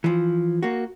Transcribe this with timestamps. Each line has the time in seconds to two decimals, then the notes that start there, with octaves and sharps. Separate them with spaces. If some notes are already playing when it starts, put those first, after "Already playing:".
0.04 E3 F3
0.63 A#3 F#4